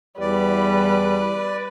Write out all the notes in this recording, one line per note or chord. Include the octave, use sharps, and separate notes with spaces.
E2 G3 B4 D5